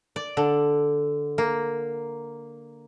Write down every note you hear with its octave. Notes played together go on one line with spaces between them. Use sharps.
D5
D3
A#3